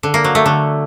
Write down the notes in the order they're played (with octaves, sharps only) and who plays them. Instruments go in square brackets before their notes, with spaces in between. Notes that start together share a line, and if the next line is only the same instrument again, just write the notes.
[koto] D3
A#3
F#3
A3
D3